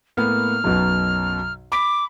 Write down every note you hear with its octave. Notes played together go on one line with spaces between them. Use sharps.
A2 A#3 B3 F6
B1 F#2 B2
B5 D6 B6